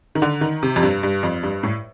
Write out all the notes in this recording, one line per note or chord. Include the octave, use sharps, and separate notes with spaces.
D#3
D3
D#3
C3
F2
G2
G2
F2
G2
A2